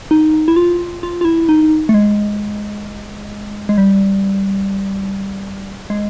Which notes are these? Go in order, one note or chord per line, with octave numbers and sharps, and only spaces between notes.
D#4
E4
F4
F4
F4
E4
D#4
A3
G#3
G#3
G3
G#3